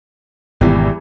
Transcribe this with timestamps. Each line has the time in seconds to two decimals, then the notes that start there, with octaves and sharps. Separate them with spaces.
0.61 G#1 E2 B2 E3 G3